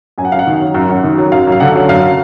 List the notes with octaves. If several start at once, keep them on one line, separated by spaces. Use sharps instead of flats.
F#2 G#5
F#5
F#2 F5
F#5
D#3
F#3
F#2
F#2
D#3
F#3
F#2 F5
F#2
F5
D3 F#5
F#3
F#2 F5